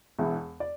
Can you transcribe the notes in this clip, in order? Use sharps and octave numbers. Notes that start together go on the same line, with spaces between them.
E1 E2 E3
D5